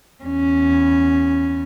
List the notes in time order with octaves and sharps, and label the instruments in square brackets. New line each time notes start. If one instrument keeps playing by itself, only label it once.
[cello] E2 C#4